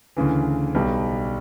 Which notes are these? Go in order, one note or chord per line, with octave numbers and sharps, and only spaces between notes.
D2 C#3 E3
B1 B2 G3